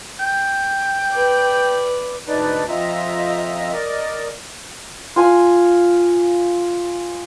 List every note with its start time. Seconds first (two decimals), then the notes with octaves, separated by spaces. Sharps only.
0.20 G5
1.11 B4 D5
2.28 D2 G#2 D4 D#4 B4 D5
2.68 F2 C4 F4 D#5 E5 A#5
3.73 A#4 D5 D#5
5.16 F4 G#5